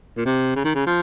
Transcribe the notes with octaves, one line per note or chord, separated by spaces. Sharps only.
A#2
C3
C#3
D#3
C#3
F3